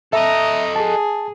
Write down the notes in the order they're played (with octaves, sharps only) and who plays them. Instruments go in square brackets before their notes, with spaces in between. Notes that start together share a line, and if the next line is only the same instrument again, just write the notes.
[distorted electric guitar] A4 D#5 [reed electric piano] E5 [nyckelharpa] A#5 D#6
[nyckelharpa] G#4 [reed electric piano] A5